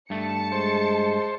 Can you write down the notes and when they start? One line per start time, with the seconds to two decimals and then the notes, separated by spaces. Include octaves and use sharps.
0.10 G2 A3 A5 C#7
0.52 G#3 C5